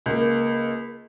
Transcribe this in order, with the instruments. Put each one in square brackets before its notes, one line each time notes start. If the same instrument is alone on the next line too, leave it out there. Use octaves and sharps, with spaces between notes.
[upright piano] C#2 A#3